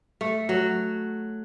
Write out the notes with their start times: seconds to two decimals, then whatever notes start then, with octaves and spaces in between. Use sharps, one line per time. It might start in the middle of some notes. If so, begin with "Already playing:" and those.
0.21 A3
0.49 F#3